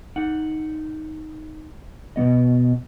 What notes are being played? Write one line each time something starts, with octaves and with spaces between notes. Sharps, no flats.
D#4 F#5
B2 F3 B3 D#5